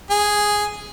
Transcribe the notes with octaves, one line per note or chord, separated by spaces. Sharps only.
G#4